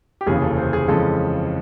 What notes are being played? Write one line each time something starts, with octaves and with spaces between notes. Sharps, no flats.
G4
F1 D#2 C#3 E3 G#4
A4
C5
G#4
F2 C#3 E3 G#3 A4